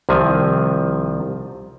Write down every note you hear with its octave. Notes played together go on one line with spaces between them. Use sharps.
C2 C3 D#3 F3 G#5